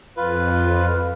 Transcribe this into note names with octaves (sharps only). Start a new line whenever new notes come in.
F2 F4 B4